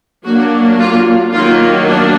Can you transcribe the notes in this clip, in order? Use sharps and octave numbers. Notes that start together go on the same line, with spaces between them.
F#3 A#3 D4 F#4
F4
D#3 F#3 A#3 F4
D4